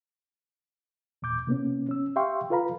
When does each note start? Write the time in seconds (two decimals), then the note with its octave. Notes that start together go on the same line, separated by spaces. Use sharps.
1.22 E2 A#2 D6 G6
1.47 C3 A#3 B3 C#4
1.89 C#4 E6
2.16 G4 E5 F5 G5 C6 C#6
2.50 F4 A4 B4 F5 A#5 B5